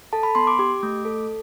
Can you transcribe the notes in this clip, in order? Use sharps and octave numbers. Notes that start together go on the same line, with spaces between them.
A4 A5
B5
B3 C6
D6
G4 D6
A3
A4